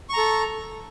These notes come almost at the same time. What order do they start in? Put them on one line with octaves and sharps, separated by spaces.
C#6 A#5 A4